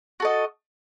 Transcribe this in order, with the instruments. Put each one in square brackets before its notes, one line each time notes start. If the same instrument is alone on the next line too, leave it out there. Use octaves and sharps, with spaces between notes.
[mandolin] F#4 A4 D#5